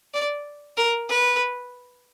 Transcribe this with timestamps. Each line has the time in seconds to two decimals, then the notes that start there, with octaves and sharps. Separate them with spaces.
0.14 D5
0.77 A#4
1.10 B4